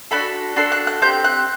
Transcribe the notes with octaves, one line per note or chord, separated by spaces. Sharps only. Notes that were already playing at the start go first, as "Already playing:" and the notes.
D4 F#4 A4 B5
D4 F#4 A4 C6
F#6
F#6
C4 G4 G6
F#6